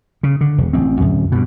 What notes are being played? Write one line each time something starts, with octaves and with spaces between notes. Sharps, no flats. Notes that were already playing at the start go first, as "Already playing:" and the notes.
C#3
D3
E1
A1 C4
D1 F#2
G2 B2